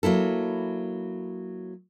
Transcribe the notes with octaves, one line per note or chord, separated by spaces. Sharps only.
F#3 A#3 E4 A4